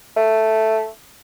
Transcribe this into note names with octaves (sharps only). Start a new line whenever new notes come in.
A3